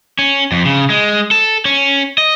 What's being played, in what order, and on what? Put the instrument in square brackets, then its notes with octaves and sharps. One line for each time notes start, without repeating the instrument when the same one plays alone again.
[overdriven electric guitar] C#4
F2
C#3
G#3
A4
C#4
D#5